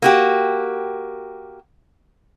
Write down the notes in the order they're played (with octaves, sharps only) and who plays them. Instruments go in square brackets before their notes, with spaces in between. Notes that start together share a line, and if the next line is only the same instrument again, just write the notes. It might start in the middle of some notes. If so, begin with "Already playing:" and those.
[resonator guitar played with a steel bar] A#3 F#4 G4